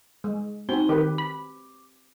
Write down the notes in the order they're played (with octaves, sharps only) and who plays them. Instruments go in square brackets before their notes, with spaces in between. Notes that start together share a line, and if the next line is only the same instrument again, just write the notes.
[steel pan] G#3
[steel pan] C4 F#4 [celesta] D#4 G7
[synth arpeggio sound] D#3 [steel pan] G4 B4 [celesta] D6
[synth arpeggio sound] B5